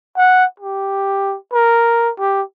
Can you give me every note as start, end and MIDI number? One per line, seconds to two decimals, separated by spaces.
0.17 0.45 78
0.60 1.36 67
1.53 2.11 70
2.19 2.42 67